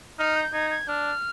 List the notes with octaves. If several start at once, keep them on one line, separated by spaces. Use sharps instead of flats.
D#4 F6
G6
D#4 G#6
G#6
D4 F6